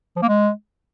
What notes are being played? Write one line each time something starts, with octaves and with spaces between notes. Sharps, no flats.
F3
A#3
G#3